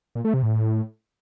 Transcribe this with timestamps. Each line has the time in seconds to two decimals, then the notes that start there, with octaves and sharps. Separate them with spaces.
0.15 A#2
0.25 A3
0.34 C3
0.43 A2